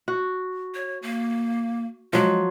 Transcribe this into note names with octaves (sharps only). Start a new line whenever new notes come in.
F#4
C#5
A#3
F3 F#3 G#3